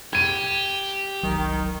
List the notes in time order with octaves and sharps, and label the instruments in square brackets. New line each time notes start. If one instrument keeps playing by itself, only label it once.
[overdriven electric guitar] G4 [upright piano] G#6 D#7
[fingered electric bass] F#1 C2 F#3 [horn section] D#3